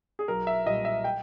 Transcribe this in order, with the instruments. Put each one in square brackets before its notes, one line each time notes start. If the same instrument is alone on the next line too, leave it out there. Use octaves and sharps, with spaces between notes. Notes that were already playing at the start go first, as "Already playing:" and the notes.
[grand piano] G#4
B1 A#4
E5
A#2 G3 D#5
E5
G5